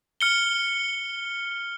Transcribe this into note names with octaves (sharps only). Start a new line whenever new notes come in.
F6 C#7 G7